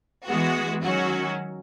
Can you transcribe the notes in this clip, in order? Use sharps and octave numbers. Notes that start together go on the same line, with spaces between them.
E3 G#3 B3 F#4
D#3 F#3 C#4 F#4